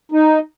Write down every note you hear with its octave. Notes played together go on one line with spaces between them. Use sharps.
D#4